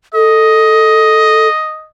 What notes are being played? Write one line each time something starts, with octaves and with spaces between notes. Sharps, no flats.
A4 D#5